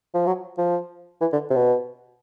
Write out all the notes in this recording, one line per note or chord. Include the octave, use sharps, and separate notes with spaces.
F3
F#3
F3
E3
D3
C3
B2